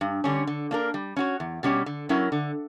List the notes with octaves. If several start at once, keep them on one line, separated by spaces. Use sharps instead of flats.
G2
D3 G3 C#4
D3
A#3 D4 A#4
G3
C#4 F#4 C#5
E2
B2 G3 C#4 G4
D3
F#3 C#4 E4 A#4
D3